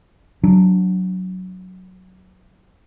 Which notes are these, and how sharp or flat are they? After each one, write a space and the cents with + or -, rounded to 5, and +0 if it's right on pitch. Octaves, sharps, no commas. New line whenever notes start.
F#3 +0 D4 +0